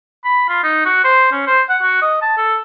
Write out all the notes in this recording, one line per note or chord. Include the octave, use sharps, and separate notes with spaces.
B5
F4
D#4
F#4
C5
C#4
C5
F#5
F#4
D#5
A5
A4